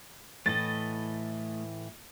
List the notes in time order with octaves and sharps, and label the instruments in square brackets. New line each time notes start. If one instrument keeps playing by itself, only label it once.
[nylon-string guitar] A2 E3 [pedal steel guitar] A3 D#5 [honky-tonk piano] A6